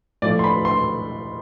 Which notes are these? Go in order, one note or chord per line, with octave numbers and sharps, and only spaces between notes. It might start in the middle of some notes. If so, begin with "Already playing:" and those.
A2 F3 A3 D5
C6
B5
C6